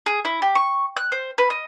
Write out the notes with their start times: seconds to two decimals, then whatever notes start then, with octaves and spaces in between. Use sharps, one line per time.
0.06 G#4
0.25 E4
0.42 G4
0.55 C#6
0.97 F#6
1.12 C5
1.38 B4
1.50 D#5